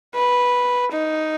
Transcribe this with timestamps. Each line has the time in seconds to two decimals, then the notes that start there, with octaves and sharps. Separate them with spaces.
0.15 B4
0.91 D#4